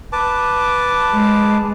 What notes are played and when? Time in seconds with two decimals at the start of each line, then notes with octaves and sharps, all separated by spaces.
0.12 B4 A5 D6
1.12 G#3